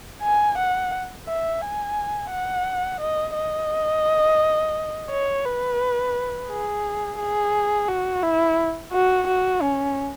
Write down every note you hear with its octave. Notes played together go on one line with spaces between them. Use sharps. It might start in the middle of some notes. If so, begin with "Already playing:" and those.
G#5
F#5
E5
G#5
F#5
D#5
D#5
C#5
B4
G#4
G#4
F#4
E4
F#4
F#4
C#4